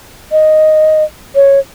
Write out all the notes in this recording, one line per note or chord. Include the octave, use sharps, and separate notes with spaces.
D#5
C#5